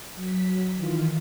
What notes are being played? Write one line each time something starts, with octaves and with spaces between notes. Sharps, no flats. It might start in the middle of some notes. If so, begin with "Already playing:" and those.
F#3 B6
D#3 E3 F4